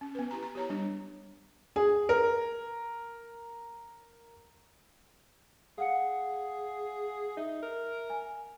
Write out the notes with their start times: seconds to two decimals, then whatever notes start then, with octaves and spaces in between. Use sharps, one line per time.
0.01 C#4
0.15 B3 B4
0.31 E4 G4 A#5
0.43 A#5
0.55 G4 C#5 A#5
0.70 G3 D4
1.76 G#4
2.09 A#4
5.78 G#4 F5 F#5 C#7
7.37 D#4 E5
7.62 A#4
8.10 G#5